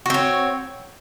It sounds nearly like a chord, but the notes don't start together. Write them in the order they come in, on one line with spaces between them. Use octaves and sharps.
F#4 C4 C#5